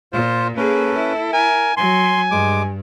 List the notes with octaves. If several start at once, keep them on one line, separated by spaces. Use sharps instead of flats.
A#2 F4 C5
A#3 C#4 G#4 A4 B4
E4
A#4 G#5
F#3 G#5 C6
G2 G#3 D6